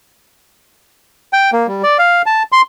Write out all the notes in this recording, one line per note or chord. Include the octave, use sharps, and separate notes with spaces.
G5
A#3
G3
D5
F5
A5
C6